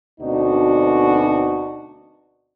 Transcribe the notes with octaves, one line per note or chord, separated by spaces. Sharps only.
D2 B2 C4 D4 D#4 F#4